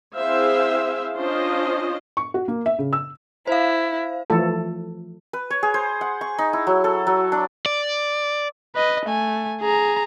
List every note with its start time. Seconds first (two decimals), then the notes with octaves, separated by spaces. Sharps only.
0.15 C4 E4 G#4 C5 E5 F5
1.16 C#4 D4 F4 C5 D#5
2.17 C#6
2.34 F#4
2.48 A#3
2.66 E5
2.79 C#3
2.93 E6
3.47 E4 C5 F5
4.30 E3 F3 A3 A4
5.33 B4
5.50 C#5
5.63 G#4
5.74 C5
6.01 F#5
6.21 C#6
6.38 D#4
6.53 E4
6.67 F#3
6.84 A4
7.07 F#3
7.32 D4
7.66 D5
8.75 B4 D#5
9.05 A3 G#5
9.61 G#4 A#5